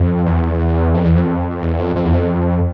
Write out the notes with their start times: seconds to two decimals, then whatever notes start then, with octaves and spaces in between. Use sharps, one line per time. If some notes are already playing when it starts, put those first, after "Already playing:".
Already playing: F2
0.26 E2
0.94 F2
1.05 E2
1.16 F2
1.61 E2
1.79 F2
1.96 F2
2.05 E2
2.13 F2